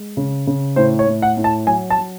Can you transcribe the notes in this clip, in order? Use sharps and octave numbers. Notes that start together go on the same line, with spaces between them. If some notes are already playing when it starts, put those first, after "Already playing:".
Already playing: G#3
C#3
C#3
A2 C5
C#5
A2
F#5
A2
A5
F#3 G#5
A5
F#3